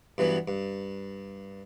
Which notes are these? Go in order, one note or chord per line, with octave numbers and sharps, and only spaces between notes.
G2 E3 F#3 B3
G2